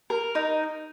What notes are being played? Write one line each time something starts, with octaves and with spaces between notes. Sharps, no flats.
A#4
D#4